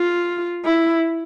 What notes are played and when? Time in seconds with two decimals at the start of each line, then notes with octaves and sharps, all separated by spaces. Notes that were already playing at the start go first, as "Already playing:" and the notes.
Already playing: F4
0.65 E4